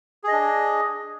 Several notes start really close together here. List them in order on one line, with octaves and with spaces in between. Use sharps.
G#4 D#5 D4